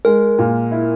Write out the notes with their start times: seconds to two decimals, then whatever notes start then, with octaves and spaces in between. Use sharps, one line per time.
0.05 G#3 A#4
0.38 A#2
0.72 E4